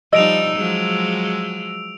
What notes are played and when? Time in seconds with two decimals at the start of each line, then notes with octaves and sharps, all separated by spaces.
0.13 F3 G3 D#4 D#5 E6 D7 F7
0.56 F3 F#3 G#3